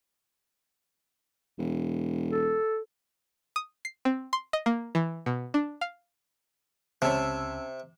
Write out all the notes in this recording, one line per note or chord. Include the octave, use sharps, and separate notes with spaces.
E1
A4
D#6
C7
C4
C6
D#5
A#3
E3
B2
D4
F5
C#2 C3 C#4 C#5 A5 E6